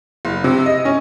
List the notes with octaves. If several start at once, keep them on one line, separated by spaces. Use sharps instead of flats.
F#1
C3
D#5
C#4